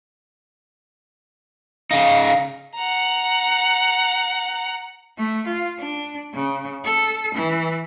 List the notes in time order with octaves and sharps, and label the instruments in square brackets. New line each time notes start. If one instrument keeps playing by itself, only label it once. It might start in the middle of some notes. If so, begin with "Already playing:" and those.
[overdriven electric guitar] C#3 D#4 [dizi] F5
[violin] F#5 A#5
[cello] A3
F4
D4
C#3
A4
E3